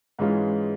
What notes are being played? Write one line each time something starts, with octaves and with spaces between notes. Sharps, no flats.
G#2 E3 G#3 C#4 F4